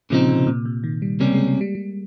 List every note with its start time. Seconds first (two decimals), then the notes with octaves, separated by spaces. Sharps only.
0.10 A#2 C#3 F3 G#3 C4 D#4
0.29 C3
0.47 A#2
0.65 C3
0.84 D#3
1.02 G3
1.20 C#2 C3 G3 A#3 C#4
1.34 G#3
1.48 G#3
1.61 G3
1.75 G3